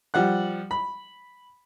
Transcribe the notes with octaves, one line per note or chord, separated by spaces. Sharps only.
F3 G3 F#5 F#6
B5